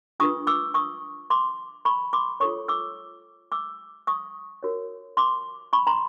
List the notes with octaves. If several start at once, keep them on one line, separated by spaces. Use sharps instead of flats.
D4 F4 G#4 B4 C#6 D#6
D6 E6
C#6 D#6
C6 D6
B5 C#6
C6 D6
F4 A4 C#5 C#6 D#6
D6 E6
D6 E6
C#6 D#6
F#4 A#4 C#5
C6 D6
B5 C#6
A#5 C6